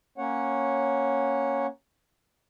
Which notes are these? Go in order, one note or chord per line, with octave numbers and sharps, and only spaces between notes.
A#3 C#4 C#5 F#5